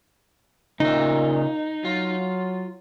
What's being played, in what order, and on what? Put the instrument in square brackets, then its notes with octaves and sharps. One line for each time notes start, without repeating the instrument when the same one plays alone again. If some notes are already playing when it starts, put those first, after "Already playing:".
[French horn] A#2 [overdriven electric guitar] C#3 E5 [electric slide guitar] D#4
[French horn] F#3 [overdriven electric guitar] F4